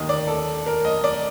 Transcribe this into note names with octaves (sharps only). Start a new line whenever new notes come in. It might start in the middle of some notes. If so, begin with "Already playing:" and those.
Already playing: D#2 D#3 D#5
D5
A4
A#4
D#5
D5